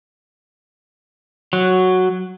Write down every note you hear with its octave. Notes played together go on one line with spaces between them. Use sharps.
F#3